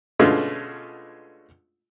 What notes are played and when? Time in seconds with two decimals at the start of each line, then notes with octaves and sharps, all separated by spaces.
0.19 B2 D3 G#3 A3 C#4 F4